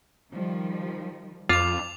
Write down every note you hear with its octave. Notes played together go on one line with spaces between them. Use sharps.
D#3 F3 G3
F2 F4 D6 F7